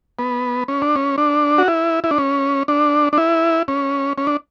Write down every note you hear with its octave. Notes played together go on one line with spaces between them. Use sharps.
B3
C#4
D4
C#4
D4
F#4
E4
E4
D4
C#4
D4
D4
E4
C#4
C#4
D4